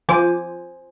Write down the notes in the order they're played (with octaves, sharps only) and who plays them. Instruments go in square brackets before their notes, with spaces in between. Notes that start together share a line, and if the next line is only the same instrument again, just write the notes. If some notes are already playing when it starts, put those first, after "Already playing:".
[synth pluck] F3 D6 [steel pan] C5 G#5